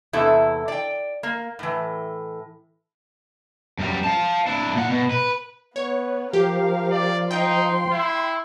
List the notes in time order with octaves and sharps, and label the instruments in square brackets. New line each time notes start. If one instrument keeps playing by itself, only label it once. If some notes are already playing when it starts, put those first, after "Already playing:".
[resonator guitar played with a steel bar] E2 C3 E4 A4
D5 G5
A#3
A2 E3
[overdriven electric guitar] F#2 G3
F5 A5
D4 E4
A#2 F#5
B2
B4
[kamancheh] B3 [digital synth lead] C#5
[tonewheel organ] F3 [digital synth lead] G4 [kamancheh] A#4 F5
[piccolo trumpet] D5
[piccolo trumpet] D#4 [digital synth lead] G5 [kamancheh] C6
[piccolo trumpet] E4